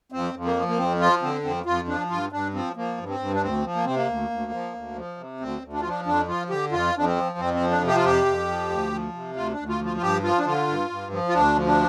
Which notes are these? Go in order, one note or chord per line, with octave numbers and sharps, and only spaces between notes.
F2 C4
F2
A#3
F3
A#3
F2 C4
F3 F4
D3 C4
F2 C4
F2 F4
F3 D4
G2 F4
G2 D4
F3 C4
F3 A#3
G2
C4
G2
D4
D2 C4
F3
A#3
C3 C4
A#3
D2
D2
F3
D2
F3
C3
D2 C4
D2
D4
F4
F3 D4
F2 D4
F3 F4
D3 G4
F2 F4
F2 D4
C4
F3
F2 C4
C4
F3
D4
C3
G4
F4
F2 G4
F2
F3
D2
F3
C3
D2 F4
D4
D2
F4
F3
F4
F4
G2 G4
F3 F4
D4
D3 F4
G2
G2
F3
F4
D2 D4
F3
D4